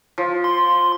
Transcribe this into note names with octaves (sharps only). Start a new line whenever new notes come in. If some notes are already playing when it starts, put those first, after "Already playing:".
F3
C6